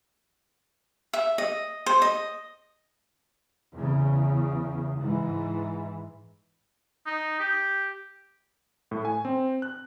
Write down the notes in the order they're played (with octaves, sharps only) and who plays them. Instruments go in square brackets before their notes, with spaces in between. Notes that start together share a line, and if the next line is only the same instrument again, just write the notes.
[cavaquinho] E5
D#5
C5
D#5
[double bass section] E2 C#3
G#2 E3
[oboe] D#4
G4
[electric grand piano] A2
G#5
C4
F#6